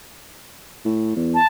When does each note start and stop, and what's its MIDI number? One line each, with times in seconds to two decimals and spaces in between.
0.85 1.12 45
1.16 1.38 40
1.34 1.46 81